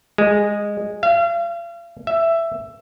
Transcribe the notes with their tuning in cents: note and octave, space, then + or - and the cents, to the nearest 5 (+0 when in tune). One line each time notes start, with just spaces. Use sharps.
G#3 -10
F5 -40
E5 +10